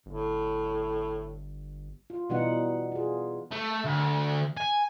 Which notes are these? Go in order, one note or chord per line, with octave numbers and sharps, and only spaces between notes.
G1 A2
F4
B2 E3 G3 B3 D#4 F#5
F4 G#4
A3
D2
G#5